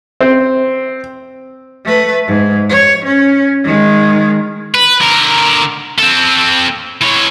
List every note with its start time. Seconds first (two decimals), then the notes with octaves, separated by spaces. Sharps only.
0.21 C4
1.85 A3 B4
2.27 G#2
2.69 C#5
3.05 C#4
3.64 D#3 G#3
4.75 B4
5.01 D3 A#4
5.98 C4 A4
7.02 E3 C#5